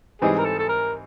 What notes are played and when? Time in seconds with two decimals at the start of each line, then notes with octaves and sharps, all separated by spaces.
0.21 G#2 E3 G3 C4 D#4 G#4
0.39 A#4
0.45 A4
0.59 A4
0.69 A#4